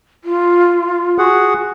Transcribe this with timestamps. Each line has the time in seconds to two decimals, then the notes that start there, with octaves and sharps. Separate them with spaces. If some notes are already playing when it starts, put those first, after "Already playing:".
0.24 F4
1.18 F#4 G#4 F#5